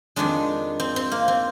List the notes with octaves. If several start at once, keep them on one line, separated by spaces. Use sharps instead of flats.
F2 D#3 G#3 D4
C4
C4
A#3
C4